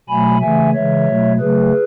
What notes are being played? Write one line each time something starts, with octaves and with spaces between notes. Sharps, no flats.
B2 F#3 A3 G#5 B5
C#3 E3 A3 E5 G#5
C#3 E3 G#3 C#5 E5
B2 F#3 A3
C#3 F#3 A3 G#4 B4